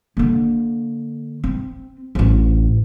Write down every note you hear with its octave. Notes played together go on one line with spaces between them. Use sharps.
D3 A#3
C4
A1 D2